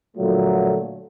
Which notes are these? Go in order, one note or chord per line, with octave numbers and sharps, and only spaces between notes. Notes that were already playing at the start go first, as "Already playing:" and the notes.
A#2 D3 F3 F#3 A3